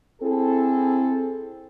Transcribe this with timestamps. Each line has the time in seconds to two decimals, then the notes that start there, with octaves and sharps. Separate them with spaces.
0.22 C4 E4 G#4 A4